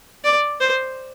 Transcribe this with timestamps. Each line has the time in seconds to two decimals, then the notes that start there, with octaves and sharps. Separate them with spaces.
0.24 D5
0.61 C5